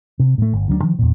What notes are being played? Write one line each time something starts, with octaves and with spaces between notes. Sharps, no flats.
C3
A2 A3
G1
D2 F#3 A#3 D4
D#3 F3
E2 A#2